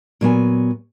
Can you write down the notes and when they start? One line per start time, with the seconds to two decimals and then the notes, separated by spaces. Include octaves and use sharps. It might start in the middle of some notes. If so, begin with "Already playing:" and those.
0.21 A#2 F#3 B3 G#5